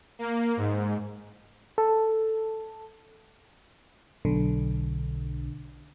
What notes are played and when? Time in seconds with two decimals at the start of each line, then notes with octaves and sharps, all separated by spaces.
0.19 A#3
0.57 G#2
1.78 A4
4.25 B1 D3